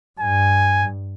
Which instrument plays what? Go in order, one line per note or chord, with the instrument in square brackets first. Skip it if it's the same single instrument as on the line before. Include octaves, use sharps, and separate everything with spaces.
[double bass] G2 [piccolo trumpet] G#5